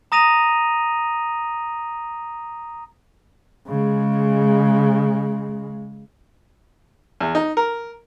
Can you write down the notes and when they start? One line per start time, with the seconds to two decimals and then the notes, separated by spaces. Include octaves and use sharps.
0.12 A#5 D#6 A#6 D#7 F7
3.68 C#3 G#3
7.21 E2
7.35 D#4
7.57 A#4